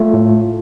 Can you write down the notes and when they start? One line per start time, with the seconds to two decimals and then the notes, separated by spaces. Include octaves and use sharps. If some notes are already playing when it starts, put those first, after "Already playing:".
Already playing: A3 F4
0.14 A2